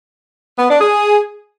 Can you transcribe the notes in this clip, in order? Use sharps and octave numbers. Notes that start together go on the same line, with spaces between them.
B3
D4
G#4